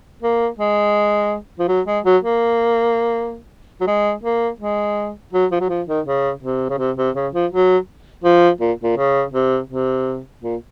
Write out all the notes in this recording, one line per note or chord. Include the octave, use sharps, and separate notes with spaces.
A#3
G#3
F3
F#3
G#3
F#3
A#3
F#3
G#3
A#3
G#3
F#3
F3
F#3
F3
D#3
C#3
C3
C#3
C3
C3
C#3
F3
F#3
F3
A#2
A#2
C#3
C3
C3
A#2